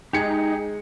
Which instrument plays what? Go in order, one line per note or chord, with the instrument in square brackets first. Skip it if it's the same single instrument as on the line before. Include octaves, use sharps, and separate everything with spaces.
[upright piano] G#3 C#7 [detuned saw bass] D#4 [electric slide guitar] G4 G#4